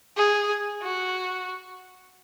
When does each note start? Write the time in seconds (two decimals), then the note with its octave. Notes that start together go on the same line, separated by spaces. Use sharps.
0.17 G#4
0.82 F#4